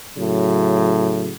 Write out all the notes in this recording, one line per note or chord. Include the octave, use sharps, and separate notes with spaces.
A2 C#3 F#3